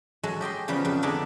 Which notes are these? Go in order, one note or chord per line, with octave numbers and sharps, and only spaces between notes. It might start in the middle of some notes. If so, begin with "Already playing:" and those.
F#3 G#3 F#4 A4
G4 D#5 G5 C6
C#3 F3 G3 A#3 B3
F2 C#3 A4
D3 G#3 B3 D4 D#4 A4